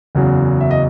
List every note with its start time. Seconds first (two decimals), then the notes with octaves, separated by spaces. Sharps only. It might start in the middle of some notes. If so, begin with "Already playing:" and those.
0.15 F#1 E2 C#3 F#3
0.61 E5
0.71 D#5